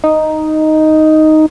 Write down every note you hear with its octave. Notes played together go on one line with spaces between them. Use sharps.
D#4